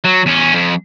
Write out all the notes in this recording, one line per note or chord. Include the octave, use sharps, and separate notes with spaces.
F#3
E2 C#4
F2